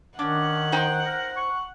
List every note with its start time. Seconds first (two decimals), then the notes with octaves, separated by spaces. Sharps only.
0.19 D#3 C#4 D4 F#5
0.72 D#4 C5 G5
1.06 A#4
1.37 C#6